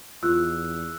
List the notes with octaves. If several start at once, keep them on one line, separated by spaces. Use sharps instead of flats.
E2 F4 E6 F#6